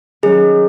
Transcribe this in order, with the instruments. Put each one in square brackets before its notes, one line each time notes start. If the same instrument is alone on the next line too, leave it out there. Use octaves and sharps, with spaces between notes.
[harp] D#3 F#3 C#4 [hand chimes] G#4